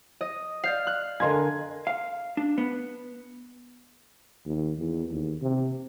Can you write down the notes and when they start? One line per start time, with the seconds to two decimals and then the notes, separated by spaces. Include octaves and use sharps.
0.21 D#5
0.64 D5 F5 G6 C7
0.87 F#6
1.20 D3 A#4 D#5 F5 G#5 C6 G#6
1.87 F5
2.37 D4
2.58 B3
4.46 D#2
4.79 E2
5.11 D#2
5.42 C3